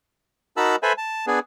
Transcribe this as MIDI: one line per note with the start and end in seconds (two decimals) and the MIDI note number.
0.57 0.76 63
0.57 0.76 66
0.57 0.76 70
0.57 0.76 81
0.57 0.76 83
0.57 0.76 88
0.83 0.93 69
0.83 0.93 71
0.83 0.93 72
0.83 0.93 76
0.83 0.93 80
0.83 0.93 83
0.98 1.26 81
1.27 1.39 59
1.27 1.39 62
1.27 1.39 68